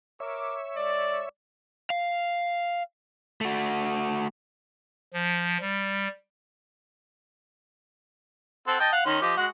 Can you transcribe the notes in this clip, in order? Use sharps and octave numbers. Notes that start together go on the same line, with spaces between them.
A#4 C#5 E5 D6
G#3 D5
F5
A3 F#4
F3
G3
C4 A4 F#5
D#5 G5 A5
F5 F#5
D#3 C#4 C6
F3 G4 D#5
G#3 F#4